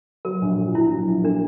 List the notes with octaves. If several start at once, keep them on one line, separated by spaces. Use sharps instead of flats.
F#3 A#4
A#1
A#2
A#1 E4
F#3
A#1
A#3 D4